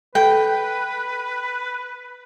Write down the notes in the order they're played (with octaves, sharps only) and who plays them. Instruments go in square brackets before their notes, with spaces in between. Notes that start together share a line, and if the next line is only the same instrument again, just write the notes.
[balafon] A4 [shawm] B4 [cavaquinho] G5